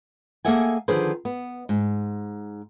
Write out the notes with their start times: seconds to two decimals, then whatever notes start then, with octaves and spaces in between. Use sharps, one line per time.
0.45 A#3 G#4 A4 E5 F#5 G#5
0.88 D3 D#3 F3 G#4 B4 C5
1.25 B3
1.69 G#2